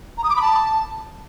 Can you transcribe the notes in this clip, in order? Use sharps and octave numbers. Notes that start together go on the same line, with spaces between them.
A#5
D#6
D6
B5
A5